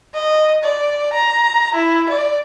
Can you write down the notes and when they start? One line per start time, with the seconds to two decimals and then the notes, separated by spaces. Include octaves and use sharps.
0.14 D#5
0.64 D5
1.13 A#5
1.75 E4
2.09 D5